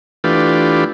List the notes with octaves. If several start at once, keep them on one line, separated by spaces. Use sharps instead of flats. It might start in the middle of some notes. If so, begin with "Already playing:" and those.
E3 A3 D4 F4 G4 B4